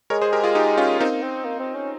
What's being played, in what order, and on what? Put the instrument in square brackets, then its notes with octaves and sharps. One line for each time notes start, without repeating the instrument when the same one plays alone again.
[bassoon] G#3 [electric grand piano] A#4 C#5
[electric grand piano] G#4 C5
G4 A#4
F4 G#4
D#4 G4
C#4 F4
[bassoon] A#3 [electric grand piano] C4 D#4
[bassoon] C4
A#3
C4
C#4